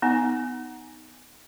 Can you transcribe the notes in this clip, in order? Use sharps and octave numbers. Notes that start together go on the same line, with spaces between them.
B3 D#4 G#5